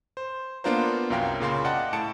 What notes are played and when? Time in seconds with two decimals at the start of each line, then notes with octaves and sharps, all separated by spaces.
0.17 C5
0.64 A#3 B3 D4 F4 A#4 C5
1.10 C2 F#2 F#3 A#4 F5 G5
1.40 A#2 C#3 F5 C6
1.64 D5 D#5 F#5 G5 A5
1.93 A2 A5 C#7 D7